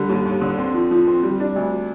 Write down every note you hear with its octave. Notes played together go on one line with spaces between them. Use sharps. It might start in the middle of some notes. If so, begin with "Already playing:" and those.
Already playing: D3 G3
D#2
D#2
D3
C4
F3
F3
C4
G3
D4
D2